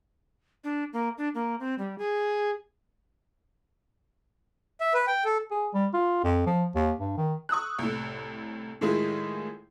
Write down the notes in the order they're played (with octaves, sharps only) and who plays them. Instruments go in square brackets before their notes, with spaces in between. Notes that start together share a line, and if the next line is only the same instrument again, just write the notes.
[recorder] D4
A#3
D4
A#3
C4
G3
G#4
[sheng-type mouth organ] E5
B4
G5
A4
[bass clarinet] G#4
G3
F4
F2
F3
D#2
G2
D#3
[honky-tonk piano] C#6 D#6 E6 F#6
C2 A2
A2 D#3 G#3 E4 F4 G#4